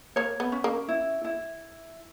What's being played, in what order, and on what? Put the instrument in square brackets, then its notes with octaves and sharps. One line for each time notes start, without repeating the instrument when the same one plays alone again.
[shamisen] A#3 [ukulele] C#5
[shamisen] B3
[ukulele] C#4
[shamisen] A#3
[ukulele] E4
E4